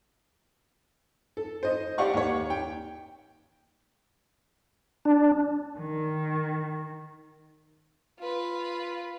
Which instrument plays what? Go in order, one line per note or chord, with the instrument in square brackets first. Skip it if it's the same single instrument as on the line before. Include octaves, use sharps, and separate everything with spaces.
[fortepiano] A4
C5 D#5
G4 D5 F5 F#5 C#6
D#2 C#5
G5
[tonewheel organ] D4
[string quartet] D#3
[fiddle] F4 B4